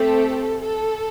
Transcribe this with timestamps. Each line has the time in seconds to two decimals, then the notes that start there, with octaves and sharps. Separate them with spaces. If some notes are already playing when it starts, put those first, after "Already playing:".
Already playing: A3 C4 G4 A4
0.62 A4